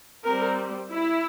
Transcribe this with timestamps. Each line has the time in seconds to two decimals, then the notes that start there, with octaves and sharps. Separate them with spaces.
0.24 G3 C4 A#4
0.92 E4